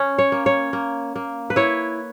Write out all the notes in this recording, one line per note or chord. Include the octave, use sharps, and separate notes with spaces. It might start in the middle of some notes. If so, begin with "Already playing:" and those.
Already playing: C#4
C#5
A#3
C#5
A#3
A#3
B4
E4 C#5